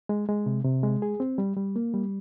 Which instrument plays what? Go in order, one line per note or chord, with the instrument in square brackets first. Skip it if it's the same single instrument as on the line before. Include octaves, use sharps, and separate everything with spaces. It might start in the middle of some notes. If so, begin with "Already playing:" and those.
[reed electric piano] G#3
G#3
C3
C3
G#3
G#4
C4
G3
G3
A#3
G3